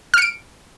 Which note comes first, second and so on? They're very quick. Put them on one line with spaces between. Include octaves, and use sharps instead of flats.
F6 C#7 D7